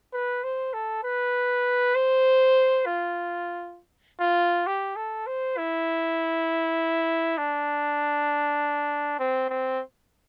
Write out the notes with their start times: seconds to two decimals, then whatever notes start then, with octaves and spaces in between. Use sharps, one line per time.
0.13 B4
0.43 C5
0.73 A4
1.04 B4
1.95 C5
2.86 F4
4.20 F4
4.67 G4
4.96 A4
5.27 C5
5.58 E4
7.38 D4
9.19 C4
9.50 C4